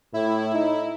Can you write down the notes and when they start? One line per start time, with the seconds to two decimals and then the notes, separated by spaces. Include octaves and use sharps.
0.14 A2 E4
0.54 D#4